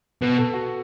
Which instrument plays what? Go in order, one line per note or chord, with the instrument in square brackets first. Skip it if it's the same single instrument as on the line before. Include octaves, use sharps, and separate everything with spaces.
[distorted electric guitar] B2 [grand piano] B4
[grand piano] A4
F#4